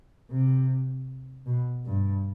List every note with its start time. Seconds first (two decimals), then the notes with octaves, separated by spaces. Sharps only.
0.31 C3
1.46 B2
1.85 G2